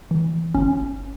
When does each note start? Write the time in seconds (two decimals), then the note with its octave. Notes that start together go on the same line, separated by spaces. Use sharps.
0.11 E3
0.55 G1 C#4